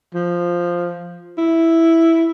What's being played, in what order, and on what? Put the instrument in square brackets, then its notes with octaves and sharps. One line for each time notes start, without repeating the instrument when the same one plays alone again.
[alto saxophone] F3
E4